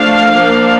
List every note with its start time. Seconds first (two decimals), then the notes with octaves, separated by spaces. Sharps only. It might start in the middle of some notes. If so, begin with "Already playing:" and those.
Already playing: F3 A3 D4 F5
0.32 F3 A#3 D4